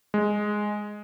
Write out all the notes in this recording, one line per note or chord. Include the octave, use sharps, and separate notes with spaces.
G#3